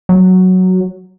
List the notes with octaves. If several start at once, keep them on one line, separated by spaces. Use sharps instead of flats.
F#3